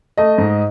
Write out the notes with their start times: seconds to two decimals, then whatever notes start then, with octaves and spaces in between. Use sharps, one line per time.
0.18 A3 D#5
0.38 G#2